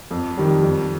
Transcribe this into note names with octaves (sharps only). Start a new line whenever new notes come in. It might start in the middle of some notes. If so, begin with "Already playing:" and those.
F2
D#3 G3
F2